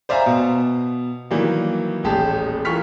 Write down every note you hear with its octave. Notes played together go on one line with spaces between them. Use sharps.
C5 D5 E5 F5 G#5 A#5
B2
D#3 E3 F#3 G3 A#3
D#1 A1 G4 G#4 A5
E3 F4 A#4 C#6 F6 B6